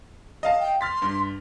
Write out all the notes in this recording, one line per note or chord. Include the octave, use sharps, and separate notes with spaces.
D#5 F5 A5
G5
C6 F6 A6 B6
G2